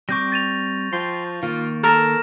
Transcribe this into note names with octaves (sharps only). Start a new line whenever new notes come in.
G3 C4 C#6 D6 G6 A#6
A6 D#7 F7
F3 G5 C6
D#3 A#3 F4
A4 A#4 F6 A#6 E7